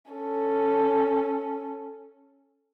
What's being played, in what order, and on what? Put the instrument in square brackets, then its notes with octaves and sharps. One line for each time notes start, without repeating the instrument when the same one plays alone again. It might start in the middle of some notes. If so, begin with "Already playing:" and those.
[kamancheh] C#4 A4